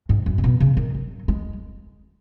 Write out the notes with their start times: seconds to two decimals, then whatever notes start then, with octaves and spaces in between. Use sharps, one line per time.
0.09 G#2
0.26 F#2
0.38 C#3
0.44 B2
0.60 C#3
0.77 D#3
0.94 F#3
1.28 G#3